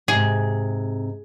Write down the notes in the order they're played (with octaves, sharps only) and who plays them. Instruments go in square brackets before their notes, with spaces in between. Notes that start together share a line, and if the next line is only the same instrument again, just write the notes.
[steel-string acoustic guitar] G#2 C3 [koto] G#4